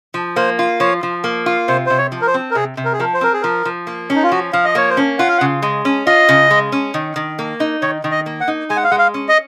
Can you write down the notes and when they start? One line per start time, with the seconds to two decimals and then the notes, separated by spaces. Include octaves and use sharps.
0.14 F3
0.36 A#3 C5
0.59 F4
0.80 F3 C#5
1.03 F3
1.24 A#3
1.46 F4
1.68 C3 C5
1.86 C3 C5
1.98 C#5
2.12 F3
2.22 A#4
2.27 C5
2.34 C4
2.51 A#4
2.55 C3 G#4
2.77 C3
2.85 A#4
2.93 G#4
3.00 F3 A#4
3.14 C5
3.21 C4 A#4
3.33 G#4
3.42 F3 A#4
3.65 F3
3.87 A#3
4.10 C#4
4.15 D#4
4.23 F4
4.31 F3 F#4
4.53 F3 F5
4.65 D#5
4.75 A#3 C#5
4.90 C5
4.97 C#4
5.19 F4 F#5
5.28 F5
5.38 F#5
5.41 C#3
5.62 G#3
5.85 C#4
6.06 F4 D#5
6.29 C#3
6.51 G#3
6.72 C#4
6.94 D#3
7.16 D#3
7.39 A#3
7.60 D#4
7.82 D#3 C#5
8.04 D#3
8.12 D#5
8.26 A#3
8.41 F#5
8.48 D#4
8.70 G#3 G#5
8.77 F#5
8.84 F5
8.91 G#3 F#5
8.99 F5
9.14 C#4
9.29 D#5